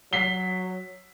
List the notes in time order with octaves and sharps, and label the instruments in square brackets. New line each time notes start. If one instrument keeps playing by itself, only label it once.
[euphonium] F#3 [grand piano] B6 C7 G7